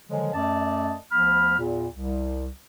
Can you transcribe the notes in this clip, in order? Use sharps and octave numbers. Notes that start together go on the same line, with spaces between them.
D3 D#3 F3 F#3 G#3
F#2 A3 D5 D#5 A5
D2 F3 B3 B5 F6
E2 A#2
C2